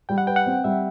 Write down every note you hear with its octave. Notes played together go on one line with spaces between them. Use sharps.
G3 G5
F#5
B4 G5
F#5
C4
G3 E5